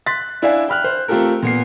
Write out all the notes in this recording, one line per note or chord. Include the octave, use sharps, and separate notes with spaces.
C6 F#6 A6 B6
D4 E4 D5 E5 F5 G#5
G5 B5 F6 F#6
C5
A3 C4 F4 G4 A4 A#4
A#2 B3 C7